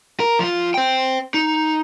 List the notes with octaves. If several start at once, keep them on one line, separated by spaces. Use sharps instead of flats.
A#4
F3 F4
C5 G5
D#4